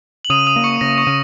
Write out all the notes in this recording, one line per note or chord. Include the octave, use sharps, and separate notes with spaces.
F#7
C#3 D#6 D#7
D#6 D#7
A#3
C#6 C#7
C#3 A#6
C#6 C#7
C#3